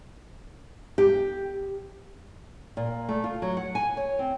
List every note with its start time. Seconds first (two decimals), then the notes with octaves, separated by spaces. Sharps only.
0.98 G4
2.77 A#2
3.09 A3
3.24 F4
3.42 F#3
3.57 F#5
3.75 G#5
3.97 C#5
4.19 C4